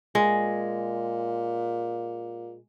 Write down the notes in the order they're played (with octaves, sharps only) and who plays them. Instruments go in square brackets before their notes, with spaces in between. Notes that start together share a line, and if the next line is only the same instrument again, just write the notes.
[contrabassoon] A#2 [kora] G#3